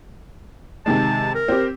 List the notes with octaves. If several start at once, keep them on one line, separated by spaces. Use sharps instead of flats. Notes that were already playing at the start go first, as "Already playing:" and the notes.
C3 D#3 G#3 A5
A#4
C4 G4